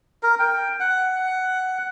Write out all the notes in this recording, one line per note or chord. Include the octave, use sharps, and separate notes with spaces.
A#4
G5
F#5